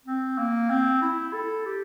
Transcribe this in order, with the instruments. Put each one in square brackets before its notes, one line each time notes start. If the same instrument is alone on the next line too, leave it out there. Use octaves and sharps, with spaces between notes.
[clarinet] C4
A#3
C4
E4
A4
G4